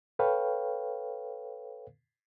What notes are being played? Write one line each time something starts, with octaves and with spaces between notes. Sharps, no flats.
A4 B4 C#5 F5 G5